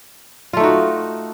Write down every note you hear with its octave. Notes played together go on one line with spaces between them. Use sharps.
A3 D#4 F4 F#4